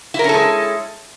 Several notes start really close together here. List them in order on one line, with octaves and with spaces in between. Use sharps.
E4 A#4 C#4 A4 G#3